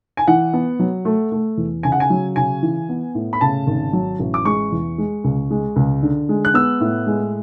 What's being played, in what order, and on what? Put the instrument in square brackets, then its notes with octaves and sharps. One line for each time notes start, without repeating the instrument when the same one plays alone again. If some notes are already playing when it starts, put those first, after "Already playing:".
[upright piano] G#5
E3 F#5
B3
F#3
A3
A3
E2
C#3 G#5
F#5
G#5
F#3
C#3 G#5
E3
B3
A2
B5
C#3 A5
G#1
F#3
A1
D6
G#3 C#6
E2
G#3
C#2
G#3
C#2
D3
G#3
F#6
B3 E6
A2
G#3